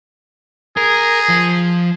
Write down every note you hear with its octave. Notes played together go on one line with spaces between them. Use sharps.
G#4 A#4
F3